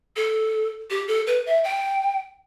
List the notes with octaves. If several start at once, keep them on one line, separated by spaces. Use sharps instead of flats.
A4
G4
A4
B4
E5
G5